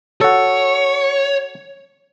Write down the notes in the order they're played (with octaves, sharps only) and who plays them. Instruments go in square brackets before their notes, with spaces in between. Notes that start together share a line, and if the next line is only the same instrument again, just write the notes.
[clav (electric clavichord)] F#4 A4 [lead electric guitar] C#5